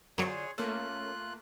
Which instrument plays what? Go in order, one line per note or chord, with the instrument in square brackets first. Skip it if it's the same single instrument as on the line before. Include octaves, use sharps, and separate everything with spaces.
[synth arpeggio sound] F#2 F#3 [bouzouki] D3 F4 C5 [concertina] G#4 C#5
[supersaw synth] A3 A#3 [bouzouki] C#4 [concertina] F4 F#6